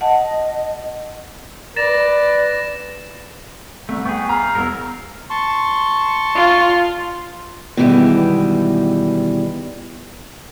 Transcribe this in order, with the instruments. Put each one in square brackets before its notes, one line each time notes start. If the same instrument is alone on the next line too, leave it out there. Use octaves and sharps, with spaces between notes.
[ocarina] D#5 [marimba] F#5 A5
[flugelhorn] B4 [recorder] D5 [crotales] A6 A#6 E7
[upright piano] C2 [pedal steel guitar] A3
[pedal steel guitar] B3 G#4 [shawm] G5 [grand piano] C#6
[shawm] F5 [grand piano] A#5
[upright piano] E1 E6 [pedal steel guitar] A#4
[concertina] A5 C6 C#6
[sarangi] F4
[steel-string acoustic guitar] B2 D#3 E3 G3 G#3